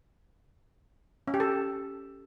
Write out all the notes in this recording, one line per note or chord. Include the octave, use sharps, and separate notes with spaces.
C#4
G4
A4